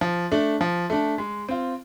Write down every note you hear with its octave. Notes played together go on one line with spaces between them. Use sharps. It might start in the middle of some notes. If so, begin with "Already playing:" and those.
F3
A3 D4
F3
A3 D4
G#3
C4 F4